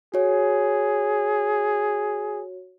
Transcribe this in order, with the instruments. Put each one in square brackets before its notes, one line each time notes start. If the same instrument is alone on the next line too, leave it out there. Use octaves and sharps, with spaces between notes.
[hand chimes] F#4 C#5 [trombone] G#4